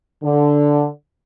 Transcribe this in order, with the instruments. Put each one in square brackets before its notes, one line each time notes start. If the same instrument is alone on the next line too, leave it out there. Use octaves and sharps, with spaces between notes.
[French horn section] D3